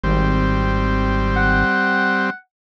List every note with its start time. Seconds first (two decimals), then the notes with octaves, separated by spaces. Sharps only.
0.04 G#1 G3 C4
1.37 F#5